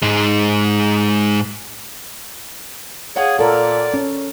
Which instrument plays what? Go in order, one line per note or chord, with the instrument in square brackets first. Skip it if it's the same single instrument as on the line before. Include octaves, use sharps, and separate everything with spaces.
[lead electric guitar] G#2 G#3
[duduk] G#4 [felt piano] C#5 F5 F#5
[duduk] A#2 [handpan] A4 A#4 [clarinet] D5
[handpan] C#4